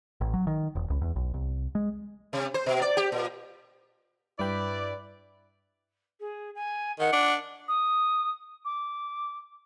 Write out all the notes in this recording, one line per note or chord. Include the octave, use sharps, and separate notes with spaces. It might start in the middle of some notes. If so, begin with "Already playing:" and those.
A1
F#3
D#3
E1
C#2
E2
B1
C2
G#3
C3
C5
B2
D5
G4
A#2
G2 E4 B4 D5 G5 B5
G#4
G#5
D#3 F#5
D4
D#6
D6